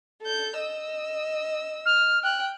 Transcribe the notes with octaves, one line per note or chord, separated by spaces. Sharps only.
A4 G6
D#5 E6
F6
G5 F#6